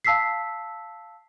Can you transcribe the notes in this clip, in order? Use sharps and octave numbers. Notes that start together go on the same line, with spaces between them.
F5 A5 E6 B6 C7